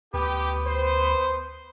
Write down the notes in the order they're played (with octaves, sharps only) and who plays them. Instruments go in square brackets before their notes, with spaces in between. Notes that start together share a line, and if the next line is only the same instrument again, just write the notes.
[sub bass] D2 [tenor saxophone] B3 [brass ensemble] G4
[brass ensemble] C5